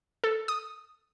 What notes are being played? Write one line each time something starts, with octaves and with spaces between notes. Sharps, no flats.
A4
D#6